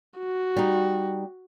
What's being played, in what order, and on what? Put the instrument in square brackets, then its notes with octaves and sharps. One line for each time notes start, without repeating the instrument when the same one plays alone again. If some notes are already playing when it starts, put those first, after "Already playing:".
[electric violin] F#4
[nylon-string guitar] G3 D#4